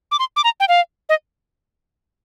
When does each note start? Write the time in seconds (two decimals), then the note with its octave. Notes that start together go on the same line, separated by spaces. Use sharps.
0.12 D6
0.19 C6
0.36 D6
0.44 A#5
0.60 G5
0.68 F5
1.09 D#5